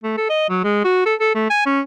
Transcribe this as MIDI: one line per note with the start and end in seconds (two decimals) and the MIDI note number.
0.04 0.14 57
0.18 0.28 69
0.30 0.49 75
0.50 0.62 54
0.64 0.79 56
0.85 1.03 66
1.06 1.14 69
1.20 1.31 69
1.35 1.49 57
1.50 1.65 80
1.66 1.80 61